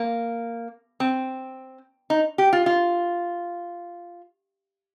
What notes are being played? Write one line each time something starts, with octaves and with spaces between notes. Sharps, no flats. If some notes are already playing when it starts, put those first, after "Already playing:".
Already playing: A#3
C4
D#4
G4
F4
F4